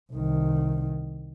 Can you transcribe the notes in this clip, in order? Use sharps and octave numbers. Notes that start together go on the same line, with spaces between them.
C2 D#3